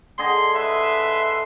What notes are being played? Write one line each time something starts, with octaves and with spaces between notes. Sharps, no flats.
D3 G#4 D#5 C6
G#3 B4 E5 C6